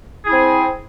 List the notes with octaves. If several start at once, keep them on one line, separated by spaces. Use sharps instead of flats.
C4 E4 G#4